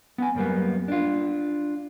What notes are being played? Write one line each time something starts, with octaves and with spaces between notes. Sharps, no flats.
B3 G#5
F#2 G3 A#3 B3
D4 F4